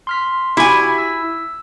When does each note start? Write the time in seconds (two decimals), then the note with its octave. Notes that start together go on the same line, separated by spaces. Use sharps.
0.07 C6 F6 B6
0.57 E4 F#4 G4 G#5 B5
0.98 E6